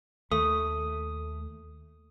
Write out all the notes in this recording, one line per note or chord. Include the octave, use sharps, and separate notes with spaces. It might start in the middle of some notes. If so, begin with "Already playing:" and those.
D#2 A3 D#6